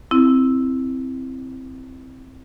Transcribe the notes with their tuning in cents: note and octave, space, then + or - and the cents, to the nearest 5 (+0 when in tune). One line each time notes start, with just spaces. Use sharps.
C4 +0 E4 +0